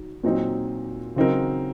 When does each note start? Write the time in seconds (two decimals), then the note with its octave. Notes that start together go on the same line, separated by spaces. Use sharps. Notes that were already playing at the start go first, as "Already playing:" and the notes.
Already playing: F#3 D#4
0.24 A#2 F#3 C4 D#4
1.16 C#3 F#3 C4 D#4 A#4